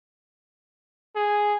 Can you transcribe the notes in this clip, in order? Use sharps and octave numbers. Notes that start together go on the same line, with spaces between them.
G#4